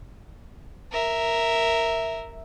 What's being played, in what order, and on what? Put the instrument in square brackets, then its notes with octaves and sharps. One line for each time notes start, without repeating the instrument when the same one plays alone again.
[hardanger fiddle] A#4 E5